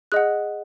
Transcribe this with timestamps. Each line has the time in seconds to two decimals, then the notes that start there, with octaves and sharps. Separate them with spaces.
0.12 G#4 D#5 F#5 F#6